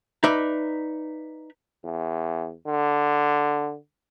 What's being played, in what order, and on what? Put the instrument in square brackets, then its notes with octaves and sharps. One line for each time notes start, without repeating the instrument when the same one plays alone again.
[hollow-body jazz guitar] D#4 B4 D5 E5
[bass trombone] E2
D3